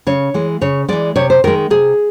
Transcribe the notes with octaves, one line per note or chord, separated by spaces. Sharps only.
C#3 C#5
E3 G#3
C#3 C#5
E3 G#3 D5
C3 C#5
C5
D#3 G#3 A#4
C3 G#4